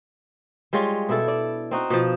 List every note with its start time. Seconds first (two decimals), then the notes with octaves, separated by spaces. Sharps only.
0.73 G3 G#3 F4 C#5
1.09 B2 D4 E4 A4
1.28 D5
1.71 C4 D#4 F#4
1.90 B2 F3